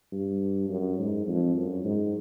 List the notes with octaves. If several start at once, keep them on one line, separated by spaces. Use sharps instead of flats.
G2
F#2
G#2
F2
F#2
G#2